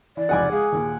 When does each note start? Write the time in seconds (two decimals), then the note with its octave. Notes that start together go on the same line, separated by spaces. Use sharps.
0.17 E3 D5
0.29 F1 C#2 D#4 F#5 G#5 D6
0.52 G#3 G#4 F5
0.72 D#2 A#2